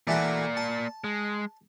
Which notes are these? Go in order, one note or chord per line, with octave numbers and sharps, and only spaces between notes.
E3 A3 A#3 F#4 D5
A5
G#3